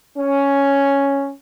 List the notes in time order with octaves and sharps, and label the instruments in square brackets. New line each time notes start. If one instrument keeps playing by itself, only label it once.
[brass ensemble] C#4